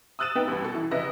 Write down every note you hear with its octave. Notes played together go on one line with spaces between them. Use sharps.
D#6 E6 F#6 A6 D#7 E7
B3 D#4 B4 G5
A1 G2
B2 A4
E3
F1 C#3 B4 D#5 E5 A#6